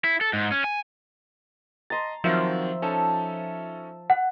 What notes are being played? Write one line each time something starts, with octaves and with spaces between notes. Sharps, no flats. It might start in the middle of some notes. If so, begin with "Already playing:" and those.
E4
A4
G#2
C#4
G#5
D#5 A#5 C6 A6
D#3 F3 F#3 C4 E5
C#4 D#4 A4 A5
F#5